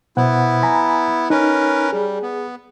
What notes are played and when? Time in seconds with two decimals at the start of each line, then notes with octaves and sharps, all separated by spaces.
0.17 B2 B3 E4 C5 F#5
0.63 G#5 A#5 B5
1.30 C#4 D#4 A#4 B4
1.93 G3 G#4
2.22 B3